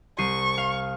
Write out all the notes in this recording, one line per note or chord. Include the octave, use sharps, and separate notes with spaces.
C2 C#6 C7 D#7
F5